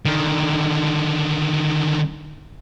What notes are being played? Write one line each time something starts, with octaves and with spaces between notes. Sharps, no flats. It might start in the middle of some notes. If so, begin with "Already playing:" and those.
D3 D#3